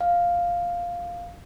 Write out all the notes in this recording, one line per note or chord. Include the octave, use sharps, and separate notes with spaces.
F5